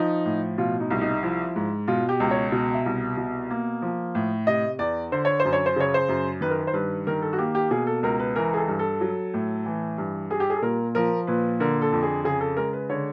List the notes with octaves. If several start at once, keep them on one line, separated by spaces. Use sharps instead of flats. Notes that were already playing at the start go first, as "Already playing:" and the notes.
Already playing: F3 D#4
A2
B2 F4
D#4
C2
D#4
F3 E4
G#2
B2 F4
G4
C#2
C#5
B2
E5
C2
B2
A#3
F3
A2
C3 D#5
E2 D5
D3 C5
C#5
C5
F#2
C#5
C5
C#3 C#5
C5
F#2
D#3 B4
A#4
B4
C5
G2 B4
D#3 A#4
A4
F#4
A#3 G4
G4
B2 G#4
A4
C#2 A#4
B4
E3 A#4
G#4
A4
G2
A4
F#3
A2
E3
G2
G3 G#4
G4
G#4
A4
A#2 A#4
F3 A#4
A#2 B4
D3 A#4
A4
F2
G#4
C#3 G#4
A4
G#3 A#4
B4
D3 C#5